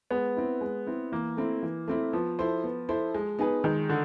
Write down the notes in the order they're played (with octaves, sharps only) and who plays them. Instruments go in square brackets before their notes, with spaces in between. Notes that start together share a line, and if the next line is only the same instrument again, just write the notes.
[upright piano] G#3 [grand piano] B3
[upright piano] C4 E4
G#3
C4 E4
[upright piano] E3 [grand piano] A#3
[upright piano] A3 C4 E4
E3
A3 C4 E4
[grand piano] F3 [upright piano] B3
[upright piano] E4 A4 C5
B3
E4 A4 C5
G#3
B3 D#4 G#4 B4
[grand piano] D#3 [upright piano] G#3
[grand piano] D3